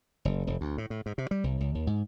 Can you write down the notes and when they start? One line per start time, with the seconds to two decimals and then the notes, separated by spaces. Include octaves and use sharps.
0.25 F#1
0.47 F1
0.61 D2
0.78 A2
0.90 A2
1.06 G#2
1.18 C3
1.31 G3
1.44 C2
1.61 C#2
1.75 D#2
1.87 G#2